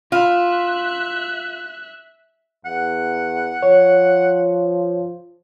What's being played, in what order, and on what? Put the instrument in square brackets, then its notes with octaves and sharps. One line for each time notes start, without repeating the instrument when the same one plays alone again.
[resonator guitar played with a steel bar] F4 [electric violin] E5 F#6
[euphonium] E2 [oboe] F#5
[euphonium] F3 [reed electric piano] C#5